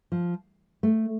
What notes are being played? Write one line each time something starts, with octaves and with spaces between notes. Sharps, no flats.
F3
A3